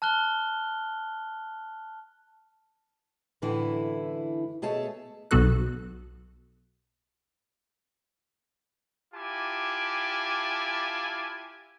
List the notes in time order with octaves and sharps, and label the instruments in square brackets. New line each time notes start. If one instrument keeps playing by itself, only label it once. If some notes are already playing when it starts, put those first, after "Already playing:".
[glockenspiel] A5 F6 F#6 G7
[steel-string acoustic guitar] F#2 A2 D3 E3 E4
B2 A3 G#4 C#5 E5 A5
[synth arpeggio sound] B1 B2 B3 F#4 A4 F#6
[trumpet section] E4 F4 G4 G#5 A5 D6